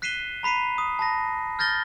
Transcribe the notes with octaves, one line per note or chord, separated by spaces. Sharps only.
F#6 B6 C7 D#7 E7 G7
A#5 B5 B6 C7 D#7
D#6
A5 B5 A#6
F6 G6 A6 A#6 G7